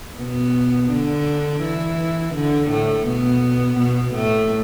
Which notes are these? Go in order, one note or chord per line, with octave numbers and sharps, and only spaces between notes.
B2 B3
D3 D4
E3 E4
D3 D4
A2 A3
B2 B3
B2 B3
A2 A3